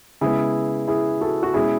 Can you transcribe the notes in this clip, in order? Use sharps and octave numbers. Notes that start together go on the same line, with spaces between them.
C#3 G#3 B3 E4 G#4
E4 G#4
F#4 A4
F#4
B2 G#3 C#4 E4 G#4